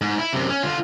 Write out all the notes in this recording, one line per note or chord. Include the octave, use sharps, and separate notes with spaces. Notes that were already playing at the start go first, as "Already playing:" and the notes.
G#2
E4
F#2 C3
C#4
D3 F4